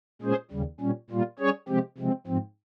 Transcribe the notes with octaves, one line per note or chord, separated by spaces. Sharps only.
A#2 G#3 C#4 G#4 C5
D#2 C#3 G3
A#2 G3 C#4
A#2 G3 A#3 F4
G3 C#4 G#4 C#5
C3 F3 G#3 C4 G4
C3 F3 G#3 C4
G#2 F3 C4